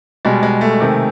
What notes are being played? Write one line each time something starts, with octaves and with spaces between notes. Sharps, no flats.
B2 G3 G#3
G#3
A3
C3 D#3 G#3